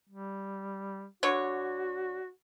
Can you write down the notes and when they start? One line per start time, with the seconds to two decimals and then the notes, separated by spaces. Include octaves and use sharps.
0.09 G3
1.23 D3 F#4 C#5